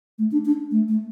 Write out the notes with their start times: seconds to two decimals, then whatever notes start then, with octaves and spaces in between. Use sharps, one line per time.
0.18 A3
0.32 D4
0.45 D4
0.71 A3
0.88 A3